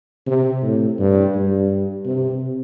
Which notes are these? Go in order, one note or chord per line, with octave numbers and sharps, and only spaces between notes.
C3
A2
G2
G2
C3